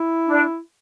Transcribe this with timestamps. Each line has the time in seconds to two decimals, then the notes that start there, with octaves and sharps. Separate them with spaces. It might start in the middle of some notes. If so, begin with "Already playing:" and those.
Already playing: E4
0.27 D4